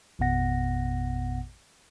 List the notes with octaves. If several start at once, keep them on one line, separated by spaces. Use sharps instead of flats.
A1 F2 B2 B3 F#5 A#6